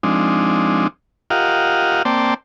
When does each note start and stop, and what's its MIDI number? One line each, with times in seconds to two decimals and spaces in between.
0.03 0.87 53
0.03 0.87 56
0.03 0.87 60
0.03 0.87 62
0.03 0.87 63
1.30 2.02 65
1.30 2.02 67
1.30 2.02 70
1.30 2.02 75
1.30 2.02 77
1.30 2.02 78
2.05 2.34 58
2.05 2.34 60
2.05 2.34 72
2.05 2.34 74
2.05 2.34 79
2.05 2.34 81